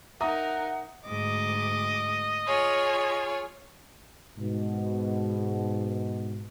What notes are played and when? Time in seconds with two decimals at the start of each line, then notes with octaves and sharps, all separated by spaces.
0.21 D#4 A#4 E5 F#5 A#5 D#6
1.05 D2 G#2 D#5 D6
2.46 F4 G#4 C#5
4.37 G#2 B2